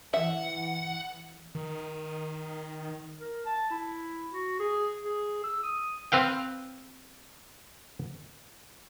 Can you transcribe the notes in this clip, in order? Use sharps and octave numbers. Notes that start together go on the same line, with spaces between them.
E3 E5 F#5
D#3
A#4
A5
E4
F#4
G#4
G#4
E6
D#6
C4 B4 F5 G5